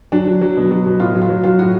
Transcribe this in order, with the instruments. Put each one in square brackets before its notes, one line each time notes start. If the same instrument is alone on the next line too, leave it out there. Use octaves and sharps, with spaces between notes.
[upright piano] F#3 D4
F#3
F#3
B2
F#3
B2
A2 F4
F#3
F4
F#3
F#3 F4
A2 F#4